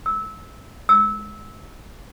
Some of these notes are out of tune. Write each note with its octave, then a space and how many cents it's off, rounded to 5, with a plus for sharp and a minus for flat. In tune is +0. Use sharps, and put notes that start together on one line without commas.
E6 -20
E6 -20